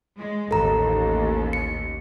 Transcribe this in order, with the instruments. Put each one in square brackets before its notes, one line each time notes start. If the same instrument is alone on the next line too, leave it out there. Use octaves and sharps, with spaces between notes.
[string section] G#3
[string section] A1 D#2 [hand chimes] A4 A#5
[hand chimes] C#7